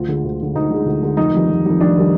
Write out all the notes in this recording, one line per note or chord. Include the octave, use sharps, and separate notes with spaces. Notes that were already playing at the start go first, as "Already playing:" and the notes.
Already playing: D2 F4
D3 G#3
D2
D3 G#3
D2 D#4
D3 G#3
D2
D3 G#3
F1 D#4
F2 D#3 G3
F1
F2 D#3 G3
F1 D4
D#3 G3